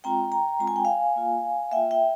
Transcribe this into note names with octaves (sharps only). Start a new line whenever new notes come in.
G#3 C4 F4 G5 A#5
G5 A#5
G#3 C4 F4 A#5
G#5
G5
F5 G#5
A#3 F4
A#3 F4 E5 G5
E5 G5